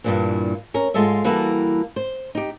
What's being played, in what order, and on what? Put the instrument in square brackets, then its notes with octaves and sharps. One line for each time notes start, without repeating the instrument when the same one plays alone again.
[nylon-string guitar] G2 A#2 E3
C#4 A#4
G#2 G#3 F4 A4 D#5 E5
E3 G3 A#3 E4 F#4 A4
C5
D#4 G4